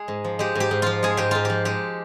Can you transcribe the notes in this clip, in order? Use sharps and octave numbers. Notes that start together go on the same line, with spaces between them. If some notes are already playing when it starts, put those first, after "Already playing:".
Already playing: G#3 G#4
G#2
F3
G#3 G4
G#2 G4
G#2
F3 F4
G#3 G#4
G#2 G4
G#2 F4
F3 G4
G#3 G4